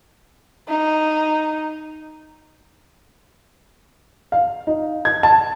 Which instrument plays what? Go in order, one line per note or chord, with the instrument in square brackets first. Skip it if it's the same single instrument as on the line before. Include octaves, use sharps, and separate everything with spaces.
[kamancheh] D#4
[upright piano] F5
D#4
G#6
A5